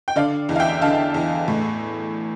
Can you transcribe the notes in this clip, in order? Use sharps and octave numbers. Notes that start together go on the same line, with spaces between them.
G5
D3 D5 F5
E2
F5
E5 G5
D3 F5 A5
E2
A2